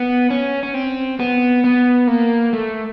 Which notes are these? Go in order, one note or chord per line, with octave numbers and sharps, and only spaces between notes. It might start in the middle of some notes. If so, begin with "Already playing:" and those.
Already playing: B3
C#4
C#4
C4
B3
B3
A#3
A3